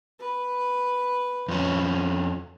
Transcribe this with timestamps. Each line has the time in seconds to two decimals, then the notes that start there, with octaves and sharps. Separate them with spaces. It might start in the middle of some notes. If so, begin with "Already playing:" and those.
0.19 B4
1.48 F2 C#4